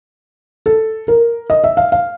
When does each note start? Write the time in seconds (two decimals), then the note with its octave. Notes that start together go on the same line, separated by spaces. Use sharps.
0.66 A4
1.08 A#4
1.50 D#5
1.64 E5
1.77 F5
1.92 F5